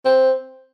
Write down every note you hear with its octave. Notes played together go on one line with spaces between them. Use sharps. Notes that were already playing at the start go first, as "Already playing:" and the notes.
C4